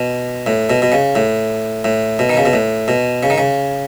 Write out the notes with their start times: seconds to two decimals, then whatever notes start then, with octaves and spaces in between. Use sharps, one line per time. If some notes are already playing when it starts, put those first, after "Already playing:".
Already playing: B2
0.46 A2
0.70 B2
0.82 B2
0.92 C#3
1.15 A2
1.84 A2
2.19 B2
2.29 D#3
2.37 C#3
2.45 B2
2.53 A2
2.88 B2
3.23 C#3
3.30 D#3
3.38 C#3